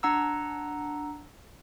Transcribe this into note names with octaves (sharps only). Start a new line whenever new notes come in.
D4 F#5 A#5 E6